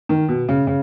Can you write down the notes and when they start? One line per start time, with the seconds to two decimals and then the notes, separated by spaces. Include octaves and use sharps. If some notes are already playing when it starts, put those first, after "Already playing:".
0.09 D#3
0.28 B2
0.48 C#3
0.67 C#3